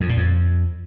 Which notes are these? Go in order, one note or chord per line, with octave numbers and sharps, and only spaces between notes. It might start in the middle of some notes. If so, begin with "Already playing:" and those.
F2
A#2
F2